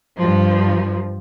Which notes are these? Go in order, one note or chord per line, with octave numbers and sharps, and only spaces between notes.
G2 F3